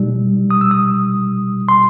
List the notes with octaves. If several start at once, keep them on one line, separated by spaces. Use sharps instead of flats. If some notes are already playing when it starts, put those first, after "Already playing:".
Already playing: B2 G3 D#4
D#6
E6
D#6
C6